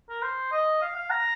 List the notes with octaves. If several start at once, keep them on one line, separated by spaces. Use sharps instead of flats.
A#4
C5
D#5
F5
F5
A#5